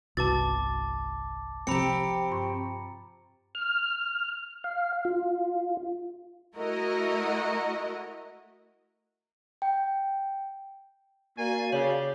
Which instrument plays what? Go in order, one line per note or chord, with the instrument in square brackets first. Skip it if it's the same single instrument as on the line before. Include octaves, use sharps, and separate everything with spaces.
[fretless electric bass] G1 C2 [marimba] F#4 B4 [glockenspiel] A5 D6 A6
[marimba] C3 F3 [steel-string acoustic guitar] C4 G4 [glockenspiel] A#5 B5 C#7
[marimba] G2 C6 C#6
[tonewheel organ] F6
F5
F4
[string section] A3 E4 F#4 A#4 D#5
[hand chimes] G5
[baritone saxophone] A#3 [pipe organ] F#4 D5 F5 [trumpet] G#5
[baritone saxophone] C#3 [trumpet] G4 [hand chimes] C#5